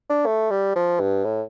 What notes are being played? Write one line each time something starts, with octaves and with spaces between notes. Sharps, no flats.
D4
A3
G3
F3
G2
A2